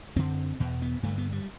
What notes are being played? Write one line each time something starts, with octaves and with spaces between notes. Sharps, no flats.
F#2 D3 C4
E2 B2
B3
G2 D3 A3
B3
G3